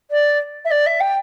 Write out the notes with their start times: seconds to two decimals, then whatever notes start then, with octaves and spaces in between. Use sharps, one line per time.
0.11 D5
0.65 E5
0.71 D5
0.86 E5
1.00 G5